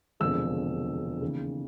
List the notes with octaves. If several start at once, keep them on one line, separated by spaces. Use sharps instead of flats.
E1 D2 C3 F3 G#3 E6
D#2 C#3 E3